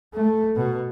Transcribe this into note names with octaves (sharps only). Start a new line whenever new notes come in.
A3
B2